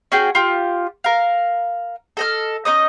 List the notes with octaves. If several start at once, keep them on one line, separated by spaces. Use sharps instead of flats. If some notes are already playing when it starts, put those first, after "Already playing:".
C#4 F#4 G#4 G5
F4 G4
A#4 F5
A4 D#5 F6
C#4 D#4 D#5 D#6